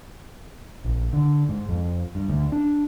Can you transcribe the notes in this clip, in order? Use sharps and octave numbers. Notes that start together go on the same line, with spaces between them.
A#1
D3
G#2
F2
G2
D2
D4